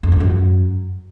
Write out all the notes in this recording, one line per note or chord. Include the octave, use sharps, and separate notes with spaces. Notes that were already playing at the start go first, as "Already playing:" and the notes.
F2
G#2
F#2